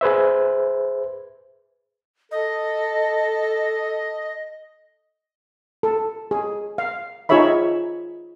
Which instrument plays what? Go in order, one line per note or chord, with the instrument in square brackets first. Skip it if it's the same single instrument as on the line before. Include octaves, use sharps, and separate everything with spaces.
[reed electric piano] G#4 B4 C5 E5
[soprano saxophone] A4 [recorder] D#5
[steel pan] A4
G#4
F5
D#4 F4 G#4 C#5 E5 B5